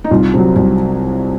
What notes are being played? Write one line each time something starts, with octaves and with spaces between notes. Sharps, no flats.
D#4
C2 F4
C3 F#3
C2